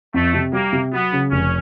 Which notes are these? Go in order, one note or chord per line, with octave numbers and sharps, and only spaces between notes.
F2 A3
C3
G3 A#3
C3
F#3 B3
C#3
F1 C#4